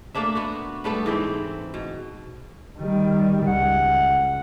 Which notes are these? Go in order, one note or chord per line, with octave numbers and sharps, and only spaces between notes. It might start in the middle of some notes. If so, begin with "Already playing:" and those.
A3 A#3 D4 E5
B3 F#4
G3 A3 B3 A4
G#2 E3 C4
B2
D#3 G3
C#2 F#5